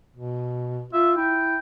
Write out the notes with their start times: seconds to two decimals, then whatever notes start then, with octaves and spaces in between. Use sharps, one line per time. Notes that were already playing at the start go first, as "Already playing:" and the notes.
0.16 B2
0.93 F4 E5
1.17 E4 G5